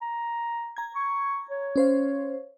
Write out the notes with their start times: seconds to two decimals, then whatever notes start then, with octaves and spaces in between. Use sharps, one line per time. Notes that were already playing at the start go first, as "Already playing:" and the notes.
0.01 A#5
0.77 A#5 G#6
0.96 C#6
1.50 C#5
1.76 C#4 C5 F5